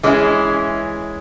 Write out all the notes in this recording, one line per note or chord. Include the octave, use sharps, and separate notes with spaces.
E3 G#3 C#4 E4 G#4